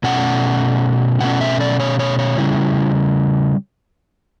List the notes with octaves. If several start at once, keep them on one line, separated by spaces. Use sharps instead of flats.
B2 A3 C#4 F#5
B2 A3 C#4 F#5
E5
D5
C#5
C#5
C#5
C#3 G3 C#4 E4